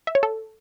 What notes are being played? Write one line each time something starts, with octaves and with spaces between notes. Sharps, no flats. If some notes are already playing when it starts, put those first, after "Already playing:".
E5
C#5
A4